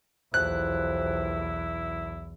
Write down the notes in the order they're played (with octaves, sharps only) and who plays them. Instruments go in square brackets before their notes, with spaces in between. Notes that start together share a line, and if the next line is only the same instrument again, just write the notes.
[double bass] B1 E2 [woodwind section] A2 C3 F3 [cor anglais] E4 [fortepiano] F#6